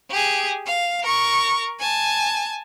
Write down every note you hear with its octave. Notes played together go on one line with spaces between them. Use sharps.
G4 G#4
F5
A#4 C#6
G#5 A5